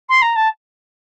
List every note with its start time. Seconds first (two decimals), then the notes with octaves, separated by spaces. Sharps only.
0.09 C6
0.22 A#5
0.36 A5